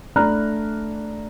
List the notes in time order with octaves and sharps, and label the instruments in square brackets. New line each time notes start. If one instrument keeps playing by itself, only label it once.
[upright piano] A3 D4 A#5 B5 F6 F#6